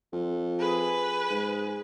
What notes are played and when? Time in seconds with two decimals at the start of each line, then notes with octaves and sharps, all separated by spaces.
0.13 F2
0.60 G#4 B4
1.30 G#2